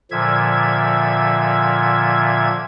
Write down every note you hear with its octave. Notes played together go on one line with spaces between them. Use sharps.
A#2 D3 F3 E5 G#6